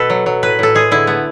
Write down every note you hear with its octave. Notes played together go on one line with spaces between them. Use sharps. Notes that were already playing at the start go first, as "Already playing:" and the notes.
Already playing: B2 A4 B4
F#3
F#3
A2 B4
A2 A4
G#3 G#4
D3 E4
A3 B3